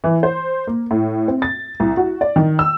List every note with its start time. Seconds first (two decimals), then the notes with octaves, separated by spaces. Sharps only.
0.04 E3
0.23 C5
0.67 A#3
0.91 A2
1.28 C4
1.42 A6
1.80 C2
1.97 F#4
2.21 D5
2.36 D#3
2.59 E6